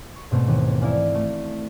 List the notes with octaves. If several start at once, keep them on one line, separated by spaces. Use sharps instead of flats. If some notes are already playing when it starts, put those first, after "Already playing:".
C#6
G#2 B2 A3 C4
D#2 E3 D#7
E4 A#4 D5 F5 G#5
A3